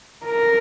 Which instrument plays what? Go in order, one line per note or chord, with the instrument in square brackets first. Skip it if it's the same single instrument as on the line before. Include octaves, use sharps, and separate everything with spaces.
[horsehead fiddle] A#4